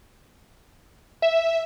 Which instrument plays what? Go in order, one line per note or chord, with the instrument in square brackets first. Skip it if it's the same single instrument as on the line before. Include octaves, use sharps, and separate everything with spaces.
[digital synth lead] E5